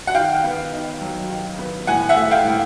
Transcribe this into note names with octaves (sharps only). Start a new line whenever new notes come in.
F#5
D#3 F5 G5
B3
D#4
F#3
D#3
B3
A2 F#5 G#5
E5 F#5
A3
F5 G5
A2